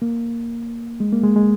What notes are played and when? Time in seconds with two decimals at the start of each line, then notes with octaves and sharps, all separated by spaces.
0.02 A#3
1.00 G#3
1.12 A#3
1.24 G#3
1.36 G#3